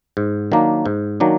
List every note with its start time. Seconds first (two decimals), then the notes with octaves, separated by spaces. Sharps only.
0.17 G#2
0.52 D#3 F#3 A#3 D4
0.86 G#2
1.20 D#3 F#3 A#3 D4